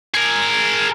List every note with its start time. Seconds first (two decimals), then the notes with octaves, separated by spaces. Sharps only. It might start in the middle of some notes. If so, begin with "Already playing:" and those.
0.14 G#4 A#4